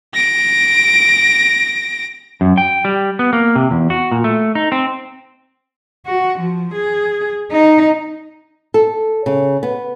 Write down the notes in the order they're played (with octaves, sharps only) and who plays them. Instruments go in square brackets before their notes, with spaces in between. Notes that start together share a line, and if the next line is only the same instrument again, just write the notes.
[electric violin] A#6 D7
[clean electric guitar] F#2
G5
G3
B3
A#3
C3
E2
F#4
A#2
A3
D#4
C4
[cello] F#4
F3
G#4
D#4
[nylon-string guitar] A4
C#3
B3